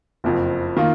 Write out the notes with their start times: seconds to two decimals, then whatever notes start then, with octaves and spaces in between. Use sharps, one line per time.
0.24 F#1 F2 F3
0.77 D#3 A#3 F4